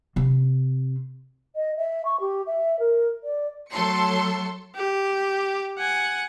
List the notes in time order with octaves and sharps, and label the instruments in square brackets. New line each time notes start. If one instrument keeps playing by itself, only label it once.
[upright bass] C3 C4
[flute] D#5
E5
C#6
G4
E5
A#4
D5
[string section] F#3 A3 A4 C6 C#7
[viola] G4
F#5 G#5